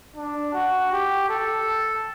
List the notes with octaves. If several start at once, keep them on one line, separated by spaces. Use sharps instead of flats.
D4
F#4
G4
A4